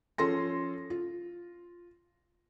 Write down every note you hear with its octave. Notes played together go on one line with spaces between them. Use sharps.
F3 C#4 A4 C6 A#6
F4